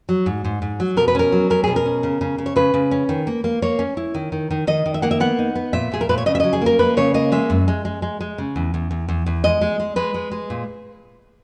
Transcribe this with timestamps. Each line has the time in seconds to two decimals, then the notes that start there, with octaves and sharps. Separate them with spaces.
0.09 F#3
0.26 G#2
0.45 G#2
0.62 G#2
0.80 F#3
0.97 B2 A#4
1.08 B4
1.15 C#4 A#4
1.32 F#3
1.50 C#4 A#4
1.64 B2 G#4
1.76 A#4
1.86 C#4
2.03 C#3
2.21 C#3
2.38 C#3
2.46 C#5
2.56 C#3 B4
2.74 C#3
2.91 C#4
3.09 D#3
3.27 A#3
3.44 A#3
3.62 A#3 C#5
3.79 C#4
3.97 E4
4.14 D#3
4.32 D#3
4.51 D#3
4.67 D#3 D#5
4.86 D#3
4.94 E5
5.02 A#3 F#5
5.11 E5
5.20 B3 F#5
5.39 D#4
5.55 B3
5.73 A#2 E5
5.92 A#2 G#4
6.01 A#4
6.09 A#2 B4
6.18 C#5
6.26 C#3 D#5
6.35 E5
6.40 F#3 D#5
6.53 G#4
6.61 A#3 A#4
6.79 A#3 B4
6.97 C#3 C#5
7.14 A#3 D#5
7.32 G#3 E5
7.50 F#2
7.68 G#3
7.85 G#3
8.02 G#3
8.20 G#3
8.38 C#3
8.56 E2
8.74 E2
8.91 E2
9.08 E2
9.26 E2
9.44 G#3 D#5
9.61 G#3
9.80 G#3
9.96 G#3 B4
10.14 G#3
10.31 G#3
10.50 A#2